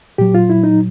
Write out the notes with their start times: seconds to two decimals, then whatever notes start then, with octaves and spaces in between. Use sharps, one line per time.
0.18 A#2 F#3 G4
0.35 F4
0.50 E4
0.64 D#4